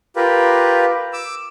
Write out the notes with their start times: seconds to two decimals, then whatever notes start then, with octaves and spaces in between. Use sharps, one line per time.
0.16 F4 G4 A#4 B4
1.13 D6 E6